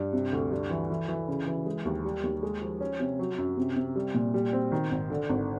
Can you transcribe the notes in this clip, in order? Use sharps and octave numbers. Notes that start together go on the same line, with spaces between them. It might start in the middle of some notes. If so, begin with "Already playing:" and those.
Already playing: G2
C3
D2
G2
E3
E3
E3
C#3
E3
G#3
D#2
G3
D#2
G#3
F3
C#4
C3
F#3
F#2
C3
C3
G3
A#2
G3
C4
D#3
G#1
D3
G#1